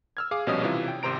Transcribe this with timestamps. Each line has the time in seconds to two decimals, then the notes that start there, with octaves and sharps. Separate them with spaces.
0.17 E6 F6 G#6
0.31 G#4 F5 D6
0.47 A#1 B2 G3 C#4 D#5 D#6
0.63 C3 E3 E4 F4
0.88 G5
1.03 G#1 C3 C5 A#5 D7